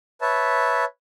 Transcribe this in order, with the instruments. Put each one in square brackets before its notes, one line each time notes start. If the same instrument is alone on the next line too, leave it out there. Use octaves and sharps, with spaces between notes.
[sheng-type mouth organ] B4 C#5 E5 A5